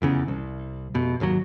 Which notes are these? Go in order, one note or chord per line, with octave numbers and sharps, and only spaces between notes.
F1 E2 C#3
C2
F1 B2
G#1 D#2 B2 F#3